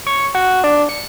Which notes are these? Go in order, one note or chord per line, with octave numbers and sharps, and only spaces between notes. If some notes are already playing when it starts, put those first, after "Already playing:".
C#5
F#4
D4
C#7